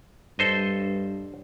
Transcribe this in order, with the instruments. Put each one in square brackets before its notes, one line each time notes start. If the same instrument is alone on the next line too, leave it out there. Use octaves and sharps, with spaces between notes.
[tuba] G2 [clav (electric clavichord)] A4 C5 D#5